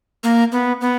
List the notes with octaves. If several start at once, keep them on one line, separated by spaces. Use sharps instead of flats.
A#3
B3
B3